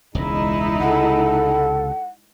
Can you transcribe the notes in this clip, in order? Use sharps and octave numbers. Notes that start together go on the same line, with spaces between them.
E1 C#2 G#3 D#4 E4
C#2 C3 A4 F#5